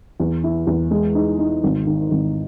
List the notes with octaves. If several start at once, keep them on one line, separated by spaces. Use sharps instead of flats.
E2
E4
E2
G#3
D#4
D#4
G#1
D#3
G#1